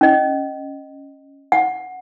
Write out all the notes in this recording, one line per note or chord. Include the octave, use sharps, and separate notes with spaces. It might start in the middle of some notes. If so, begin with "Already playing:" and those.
C#4 D#5
F#5